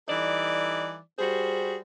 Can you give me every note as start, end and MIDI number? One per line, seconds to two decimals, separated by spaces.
0.09 0.98 52
0.09 0.98 55
0.09 0.98 63
0.09 0.98 69
0.09 0.98 74
1.19 1.77 55
1.19 1.77 66
1.19 1.77 68
1.19 1.77 72